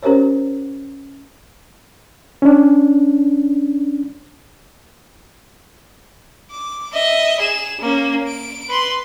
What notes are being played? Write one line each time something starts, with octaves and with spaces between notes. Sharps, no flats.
C#4 G4 A#4 C5 C#5
C#4 D4
D6
D#5 E5
G#4 E7
A#3 C#4
D7
B4 C6